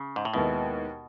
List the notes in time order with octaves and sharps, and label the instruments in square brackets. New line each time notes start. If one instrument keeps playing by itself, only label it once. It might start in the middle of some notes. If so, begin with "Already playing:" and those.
Already playing: [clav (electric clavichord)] C#3
G#2
A2
[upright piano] D#2 D#3 G#3 B3 E4 [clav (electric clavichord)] B2